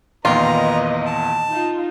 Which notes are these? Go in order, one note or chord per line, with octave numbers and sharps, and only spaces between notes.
E2 A#2 D#3 F4 B4 D#5 A#5
A5
D#4 F4